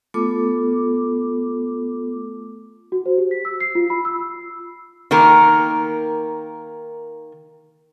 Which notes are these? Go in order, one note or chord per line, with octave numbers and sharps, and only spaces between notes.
A3 B3 F4 A4 D6
F#4
C5
G4
B6
E6
C7
F4
B5
E6
D#3 A#3 A#4